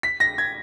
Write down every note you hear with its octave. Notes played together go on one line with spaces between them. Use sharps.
B6
A#6
G#6